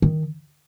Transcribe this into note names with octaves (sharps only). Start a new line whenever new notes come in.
D#3